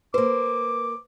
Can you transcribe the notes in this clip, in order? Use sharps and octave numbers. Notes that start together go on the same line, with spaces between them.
A#3 B4 C5 D6